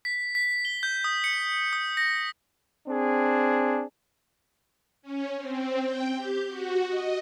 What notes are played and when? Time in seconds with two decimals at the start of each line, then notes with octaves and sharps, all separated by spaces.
0.05 B6
0.35 B6
0.65 G7
0.83 G6
1.04 D#6
1.24 C#7
1.73 D#6
1.97 A#6
2.88 C4 D4 G#4
5.02 C#4
5.37 C4
5.80 G5
6.17 G4
6.48 F#4
6.88 D#5